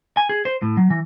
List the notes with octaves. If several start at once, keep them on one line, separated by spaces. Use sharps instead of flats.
G#5
G#4
C5
A2
F#3
E3